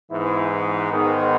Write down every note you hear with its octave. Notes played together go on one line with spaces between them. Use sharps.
G#2 E3 B3 E4
G#2 D#3 G#3 B3